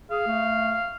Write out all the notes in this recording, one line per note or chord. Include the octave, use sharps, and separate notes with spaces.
G#4 F5
A3